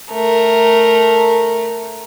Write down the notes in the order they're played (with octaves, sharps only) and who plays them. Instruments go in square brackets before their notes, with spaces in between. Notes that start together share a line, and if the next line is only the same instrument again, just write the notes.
[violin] A3 A#4